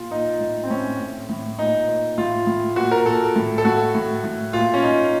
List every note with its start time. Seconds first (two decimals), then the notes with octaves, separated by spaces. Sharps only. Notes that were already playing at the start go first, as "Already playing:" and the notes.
Already playing: A#2 F4
0.11 A#2 D#4
0.41 A2
0.64 C4
0.70 A2 C#4
1.00 A2
1.29 A2
1.59 A#2 D#4
1.88 A#2
2.18 A2 F4
2.47 A2
2.76 A#2 F#4
2.92 A#4
3.06 A#2 A4
3.36 A2
3.58 A4
3.65 A2 F#4
3.95 A2
4.24 A2
4.53 A#2 F4
4.73 C#4
4.83 A#2 D#4